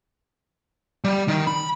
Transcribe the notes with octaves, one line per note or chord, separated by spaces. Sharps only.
G3
D#3
B5